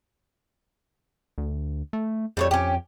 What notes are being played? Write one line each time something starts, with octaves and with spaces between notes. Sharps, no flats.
D2
A3
F2 G3 A3 C#5
F2 C#4 G4